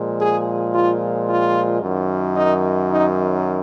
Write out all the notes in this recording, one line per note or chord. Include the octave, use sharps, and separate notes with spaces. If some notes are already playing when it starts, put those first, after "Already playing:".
Already playing: A#2 F3 G#3
G#4
F4
F4
F#2 D#3 F#3
D#4
D#4